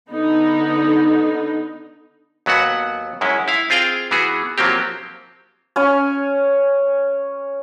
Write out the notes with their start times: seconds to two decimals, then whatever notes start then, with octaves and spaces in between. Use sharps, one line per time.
0.10 D3 B3 D#4
2.46 D#2 F#3 B3 F#4 F#5
3.21 F#2 G#3 C#4 E4
3.48 E4 F5
3.70 C4 F4 G#4 F5 G5
4.11 E3 B3 F#4 G#4
4.58 F3 F#3 A#3 C4 G4
5.76 C#4 C#5 G#5 C#6